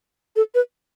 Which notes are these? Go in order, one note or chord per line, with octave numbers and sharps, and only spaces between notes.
A4
B4